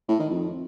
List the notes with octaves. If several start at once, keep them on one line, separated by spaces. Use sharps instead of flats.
A2
D#3
F2